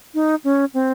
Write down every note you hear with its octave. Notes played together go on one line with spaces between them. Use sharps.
D#4
C#4
C4